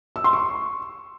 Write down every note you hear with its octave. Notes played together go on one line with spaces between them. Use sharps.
E6
C6
C#6